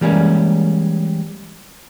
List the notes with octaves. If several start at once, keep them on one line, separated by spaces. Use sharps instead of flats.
E3 G3 G#3 A#3 C#4